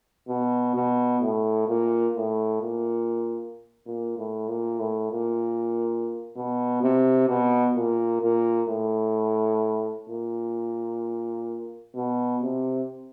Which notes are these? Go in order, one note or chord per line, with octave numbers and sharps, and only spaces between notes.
B2
B2
A2
A#2
A2
A#2
A#2
A2
A#2
A2
A#2
B2
C3
B2
A#2
A#2
A2
A#2
B2
C3